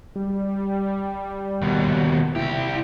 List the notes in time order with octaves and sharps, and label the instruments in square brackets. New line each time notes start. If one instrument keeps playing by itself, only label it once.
[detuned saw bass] G3
[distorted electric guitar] D#2 B2
[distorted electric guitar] C2 G4 [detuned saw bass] E4